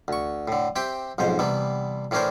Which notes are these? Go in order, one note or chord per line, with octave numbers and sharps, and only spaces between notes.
D2 C#6
A2 D3
C4 G4 E5 G5
B1 F2 G#2 C5
C3 E3 G3 B3
A2 E3 C#4 D4 A#4 C5